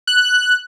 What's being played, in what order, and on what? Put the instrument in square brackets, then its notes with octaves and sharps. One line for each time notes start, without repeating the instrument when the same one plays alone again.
[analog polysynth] F#6